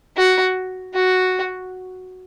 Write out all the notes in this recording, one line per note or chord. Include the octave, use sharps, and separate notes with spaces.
F#4
F#4